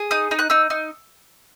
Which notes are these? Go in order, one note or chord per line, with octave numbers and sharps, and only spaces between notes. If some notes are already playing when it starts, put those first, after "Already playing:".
Already playing: G#4
D#4 D#6
D#4
F#6
D#4 E6
D#4